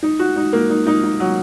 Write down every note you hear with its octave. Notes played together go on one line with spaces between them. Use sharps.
D#4
F#4
D#4
A#3
D#4
D#4
D#4
F#3